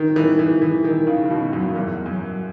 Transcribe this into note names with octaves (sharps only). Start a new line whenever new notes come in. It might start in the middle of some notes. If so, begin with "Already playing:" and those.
Already playing: D#3
E3
E3
E3
D#3
C#3
C#3
B2
F#2
F#2
E2
F#2